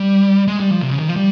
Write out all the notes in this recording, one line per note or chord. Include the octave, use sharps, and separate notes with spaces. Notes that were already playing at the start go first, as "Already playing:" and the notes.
Already playing: G3
G#3
G3
F3
C3
C#3
D#3
F3
G3